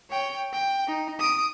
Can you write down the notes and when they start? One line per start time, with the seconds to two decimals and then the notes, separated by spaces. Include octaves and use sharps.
0.10 C#5 G5
0.53 G5
0.88 D#4
1.19 D#6 D7